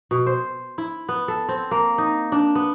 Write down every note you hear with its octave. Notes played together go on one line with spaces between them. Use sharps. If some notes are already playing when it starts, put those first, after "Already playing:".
B2
C5
E4
B3
A4
C4
A#3
D#4
D4
B3